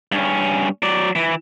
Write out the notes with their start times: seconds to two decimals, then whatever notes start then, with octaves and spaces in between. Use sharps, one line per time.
0.12 G2 C#4
0.82 F#3 D5
1.15 E3